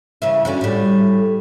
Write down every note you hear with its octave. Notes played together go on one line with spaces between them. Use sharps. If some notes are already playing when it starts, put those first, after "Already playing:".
C#3 E3 E4
D3 C#4 F#4
A2 G3